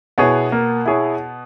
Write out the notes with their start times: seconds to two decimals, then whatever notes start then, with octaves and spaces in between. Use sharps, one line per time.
0.18 B2 B3 E4 G#4 C#5
0.52 A#3
0.86 E4 G#4 C#5